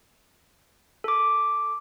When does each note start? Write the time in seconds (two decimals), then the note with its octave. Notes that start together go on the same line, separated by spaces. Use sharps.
1.04 A4 D6